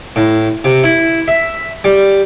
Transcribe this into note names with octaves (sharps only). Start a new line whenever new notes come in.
A2
C3
E4
E5
G3